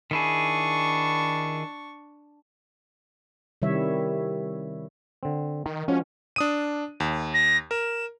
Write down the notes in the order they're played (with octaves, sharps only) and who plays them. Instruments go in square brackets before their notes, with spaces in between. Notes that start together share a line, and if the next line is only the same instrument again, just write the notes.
[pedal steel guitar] D#3 E4 G#4 [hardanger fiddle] D4 C#6
[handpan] C3 D#3 G3 E4 C#5 E5
[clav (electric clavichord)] D3 C4
[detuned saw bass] D#3
[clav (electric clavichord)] F3 G#3 F#4 [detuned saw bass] C#4
[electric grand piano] D4 D#6 D#7
D#2
[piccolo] A#6
[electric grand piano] A#4 [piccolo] E7